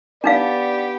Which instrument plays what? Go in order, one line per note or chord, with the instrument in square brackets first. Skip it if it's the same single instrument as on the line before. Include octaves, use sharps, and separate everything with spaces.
[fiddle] B3 G4 [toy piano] D4 D#4 F5 [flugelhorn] D5